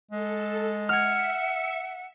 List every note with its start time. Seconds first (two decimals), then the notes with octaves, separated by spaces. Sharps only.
0.11 G#3 A4
0.89 E5 F#5 F6 G#6 C#7